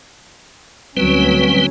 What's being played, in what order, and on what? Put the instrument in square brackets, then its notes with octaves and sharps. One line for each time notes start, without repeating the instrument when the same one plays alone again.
[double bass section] D2 F#3 C#4 [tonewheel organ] G3 C4 B4